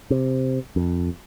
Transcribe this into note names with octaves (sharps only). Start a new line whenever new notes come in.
C3
F2